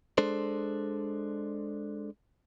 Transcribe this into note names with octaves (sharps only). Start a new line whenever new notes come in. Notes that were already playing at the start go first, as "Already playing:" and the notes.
G#3 D4 A4 C5